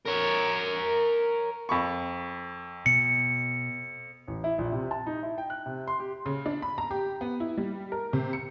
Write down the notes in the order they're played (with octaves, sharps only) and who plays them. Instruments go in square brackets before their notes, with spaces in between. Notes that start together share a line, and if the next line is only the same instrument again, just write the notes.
[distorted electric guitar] A#4 C#5
[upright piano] F2 B5 C#6
[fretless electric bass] B2 [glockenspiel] C#7
[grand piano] A1
E4
A#1
C3
A5
D#4
E4
G5
F#6
C3
C6
G4
[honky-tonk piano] C#3
D4
B5
A#5
G4
B3
E4
G3
A#4
C3
C#7